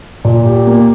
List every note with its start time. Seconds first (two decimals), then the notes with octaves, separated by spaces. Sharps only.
0.25 A#2
0.46 G4
0.67 A#3